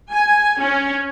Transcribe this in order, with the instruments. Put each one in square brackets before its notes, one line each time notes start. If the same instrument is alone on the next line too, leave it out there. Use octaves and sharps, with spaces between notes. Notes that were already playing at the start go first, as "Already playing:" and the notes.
[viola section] G#5
C#4